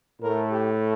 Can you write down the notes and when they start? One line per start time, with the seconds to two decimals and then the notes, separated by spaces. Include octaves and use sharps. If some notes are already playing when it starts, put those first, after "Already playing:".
0.22 A2 A3 A#4
0.51 G4